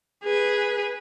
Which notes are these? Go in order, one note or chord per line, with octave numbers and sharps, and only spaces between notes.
G#4 B4